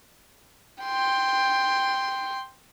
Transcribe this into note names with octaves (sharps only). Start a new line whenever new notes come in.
G5 C6